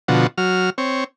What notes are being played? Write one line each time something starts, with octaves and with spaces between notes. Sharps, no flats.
B2 D3 F3 F#4
F#3 F6
C4 C#5